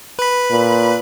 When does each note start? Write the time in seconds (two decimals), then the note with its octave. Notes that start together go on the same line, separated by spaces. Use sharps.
0.19 B4 B5
0.51 A#2